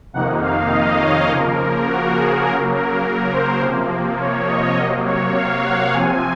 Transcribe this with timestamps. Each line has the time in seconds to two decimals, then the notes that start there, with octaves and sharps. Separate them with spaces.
0.13 F2 C3 D#3 A#3 D#4 F#5
0.42 F5
0.71 D#5
1.01 C#5
1.29 C#3 F3 A#3 A#4
1.87 F#4
2.17 G#4
2.45 C#3 F#3 A#3 A#4
2.74 A#4
3.03 A#4
3.32 C5
3.61 C3 F3 A#3
4.19 C#5
4.48 D#5
4.77 C3 F#3 A#3 D#5
5.06 C#5
5.35 F5
5.64 F#5
5.92 C3 F3 C4 G#5